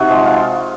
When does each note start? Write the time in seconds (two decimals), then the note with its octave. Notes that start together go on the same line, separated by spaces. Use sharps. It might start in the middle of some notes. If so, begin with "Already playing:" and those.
Already playing: C3 D#4 F#4
0.09 F3 G#3
0.25 F4